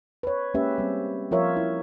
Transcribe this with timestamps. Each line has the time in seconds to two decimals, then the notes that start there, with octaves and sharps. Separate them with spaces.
0.23 B4 C#5
0.54 G#3 A#3 C#4 G4 B4 E5
0.78 G3 C4
1.31 F3 F4 A#4 C#5 E5
1.57 E4